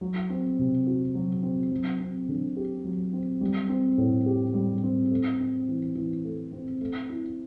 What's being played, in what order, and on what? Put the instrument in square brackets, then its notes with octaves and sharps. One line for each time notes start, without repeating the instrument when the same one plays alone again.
[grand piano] F#3
C4
C3
F#4
F#3
C4
F#3
C4
D3
G4
F#3
C4
G3
C4
A2
G4
G3
C4
A3
C4
E3
E3
A3
C4
A3
E4